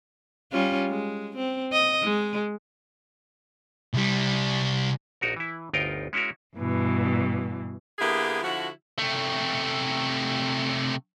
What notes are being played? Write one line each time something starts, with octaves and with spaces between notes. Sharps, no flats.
G3 C#4 F4
G#3
C4
D#5
G#3
C2 G3
A#1 D#4 F#4 A#4
E3 E4
G1 D2 D#4 F4 A#4 G5
G#3 C#4 E4 F#4 A#4
G2 B2 E3
D3 A#3 B3 E4 G4 G#4
D3 F3 E4 F#4
C3 A3